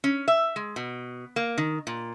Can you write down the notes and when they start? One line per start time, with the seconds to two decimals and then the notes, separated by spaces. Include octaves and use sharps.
0.04 C#4
0.28 E5
0.56 G#3
0.76 B2
1.36 A#3
1.58 D#3
1.87 A#2